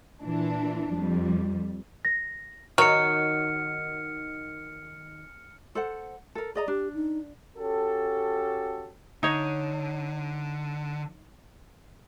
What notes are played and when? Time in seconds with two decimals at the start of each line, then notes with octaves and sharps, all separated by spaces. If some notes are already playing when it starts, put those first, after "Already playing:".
0.23 A#2 E3 D4
0.93 F2 G3
2.05 A#6
2.78 D#3 F#3 F6 C#7
5.75 A4 C5 F#5
6.35 A4 A#4
6.55 G#4 D5 D#5 A#5
6.68 D4 G4
6.95 D#4
7.57 C#4 F#4 G4 A4
9.23 D3 D#4 C#5